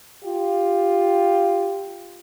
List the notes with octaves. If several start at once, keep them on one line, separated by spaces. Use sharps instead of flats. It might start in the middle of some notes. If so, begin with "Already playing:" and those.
F4 G4